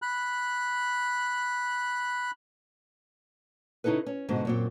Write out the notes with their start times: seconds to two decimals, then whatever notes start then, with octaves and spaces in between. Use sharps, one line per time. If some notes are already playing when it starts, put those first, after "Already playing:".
0.02 B5 F#6
3.84 C#3 D#4 E4 A4 B4
4.06 C#4
4.28 G#2 B2 D3
4.45 F#2 A#2 C4